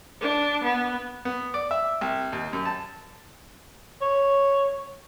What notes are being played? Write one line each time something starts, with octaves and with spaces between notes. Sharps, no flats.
D4
B3
B3
D5
E5
C2
D#2
F#2
A5
C#5